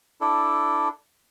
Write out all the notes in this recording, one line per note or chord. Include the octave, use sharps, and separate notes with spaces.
D4 E4 A4